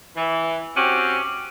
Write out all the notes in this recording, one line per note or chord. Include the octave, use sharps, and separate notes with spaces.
E3
C4 C#4 F#4 G4